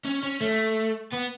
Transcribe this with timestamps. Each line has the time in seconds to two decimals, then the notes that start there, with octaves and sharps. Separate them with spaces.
0.05 C#4
0.23 C#4
0.41 A3
1.12 B3